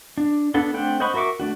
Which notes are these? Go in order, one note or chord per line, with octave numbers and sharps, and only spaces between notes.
D4
B3 D4 A4 F#5
A3 C4 D4 F#5 G5
C5 D#5 F#5 B5 C#6
F#4 A#4 E5 C#6 D6
A3 D4 F#4